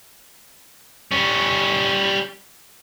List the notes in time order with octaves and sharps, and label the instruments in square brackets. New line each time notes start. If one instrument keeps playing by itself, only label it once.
[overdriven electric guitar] G3 C#4